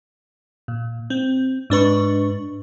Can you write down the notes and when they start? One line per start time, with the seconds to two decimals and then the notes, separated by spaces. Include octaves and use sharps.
0.68 A#2
1.10 C4
1.70 G#2 D4 B4 C#6